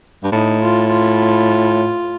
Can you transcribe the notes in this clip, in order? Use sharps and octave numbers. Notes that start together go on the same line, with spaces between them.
G2
A2 D#4
F4
F4